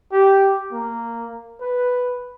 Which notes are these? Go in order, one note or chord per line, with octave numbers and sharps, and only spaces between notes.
G4
A#3
B4